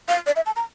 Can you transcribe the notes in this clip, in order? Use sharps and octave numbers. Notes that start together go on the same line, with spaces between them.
F5
D5
E5
A5
A#5